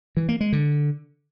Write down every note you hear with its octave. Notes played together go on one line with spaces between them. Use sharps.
E3
A#3
G#3
D3